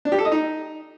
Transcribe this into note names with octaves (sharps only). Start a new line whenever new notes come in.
D4
G4
A4
D#5
D#4